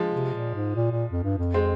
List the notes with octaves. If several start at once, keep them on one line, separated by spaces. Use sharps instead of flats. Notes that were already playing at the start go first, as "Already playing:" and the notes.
Already playing: F3 G#3
C3
A#2
G#2
A#2
A#2
F2
G2
F2
G#3 C4